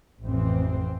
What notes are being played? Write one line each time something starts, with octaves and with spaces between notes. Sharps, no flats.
A1 F2 E3 C4